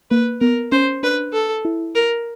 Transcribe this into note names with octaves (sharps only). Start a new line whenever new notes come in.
A#3 B4
B3 A#4
C#4 C5
D4 B4
A4
E4
A#4